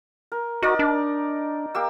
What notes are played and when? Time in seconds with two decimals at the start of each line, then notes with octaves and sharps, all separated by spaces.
0.32 A#4
0.62 D#4 F#4 A#4 D5
0.79 D4
1.75 A#3 G4 E6